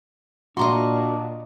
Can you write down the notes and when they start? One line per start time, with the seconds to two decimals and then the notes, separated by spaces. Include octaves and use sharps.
0.57 A#2 D4 F#4 D#5 A#5 C6